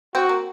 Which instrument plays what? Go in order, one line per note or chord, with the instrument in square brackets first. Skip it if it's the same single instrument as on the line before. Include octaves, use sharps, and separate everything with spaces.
[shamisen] C4 [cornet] F#4
[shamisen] A#3